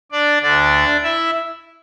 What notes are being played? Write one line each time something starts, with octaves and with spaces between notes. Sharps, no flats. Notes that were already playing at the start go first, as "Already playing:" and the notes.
D4 D5
D2 D3 D4 D5
E4 E5